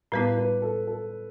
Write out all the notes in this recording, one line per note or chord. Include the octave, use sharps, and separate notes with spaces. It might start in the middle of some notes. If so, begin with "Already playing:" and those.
A2 G3 B3 E4 B4
B4
A4
A4